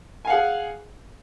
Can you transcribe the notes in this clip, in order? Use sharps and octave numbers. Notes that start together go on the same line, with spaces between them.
G#4 F5 F#5 G#5